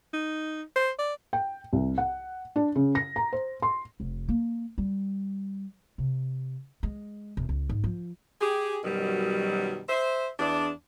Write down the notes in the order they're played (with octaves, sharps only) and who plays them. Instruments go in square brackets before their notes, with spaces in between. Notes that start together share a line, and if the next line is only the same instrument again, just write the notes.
[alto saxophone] D#4
C5
D5
[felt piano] G5
C2
F#5
D4
C#3
A#6
A#5
C5
C6
[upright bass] F1
A#3
G3
C3
G#3
E1
C#2
G#2
F3
[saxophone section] G4 G#4
F#2 B2 D#3 F#3 G3
C5 E5
E2 D4